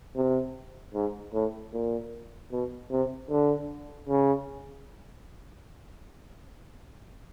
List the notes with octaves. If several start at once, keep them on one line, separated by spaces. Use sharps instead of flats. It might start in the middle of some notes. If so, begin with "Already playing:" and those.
C3
G#2
A2
A#2
B2
C3
D3
C#3